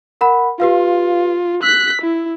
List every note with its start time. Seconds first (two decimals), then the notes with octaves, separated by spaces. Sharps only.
0.21 A#4 F#5 B5
0.60 F4 G4 B4 F5
1.63 E6 F#6 B6
2.01 E4